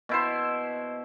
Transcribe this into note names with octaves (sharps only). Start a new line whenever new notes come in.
B2 E4 C5